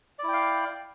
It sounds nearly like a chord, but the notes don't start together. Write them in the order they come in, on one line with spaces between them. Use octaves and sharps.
D5 E4 G5 F5